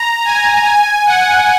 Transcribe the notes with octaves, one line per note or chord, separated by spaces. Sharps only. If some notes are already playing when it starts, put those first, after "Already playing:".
Already playing: A#5
G#5
G#5
F#5